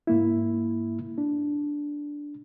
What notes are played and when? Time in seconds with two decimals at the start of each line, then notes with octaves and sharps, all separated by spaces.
0.07 G#2 A#3 E4
1.18 D4